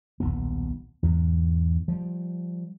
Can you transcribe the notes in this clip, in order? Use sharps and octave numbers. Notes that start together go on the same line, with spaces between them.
D#1 B1 B3
E2 G#2
F3 G3